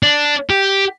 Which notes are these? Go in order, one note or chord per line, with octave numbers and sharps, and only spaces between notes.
D4
G4